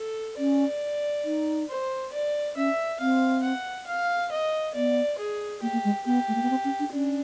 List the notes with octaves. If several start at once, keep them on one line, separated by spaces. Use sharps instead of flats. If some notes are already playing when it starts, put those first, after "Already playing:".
Already playing: A4
C#4 D5
D#4
C5
D5
C#4 E5
C4 F5
F#5
F5
D#5
B3 D5
G#4
A#3 G4
A#3
G#3
B3 G4
A3
A#3
B3
C4
C#4
D4
C#4 D4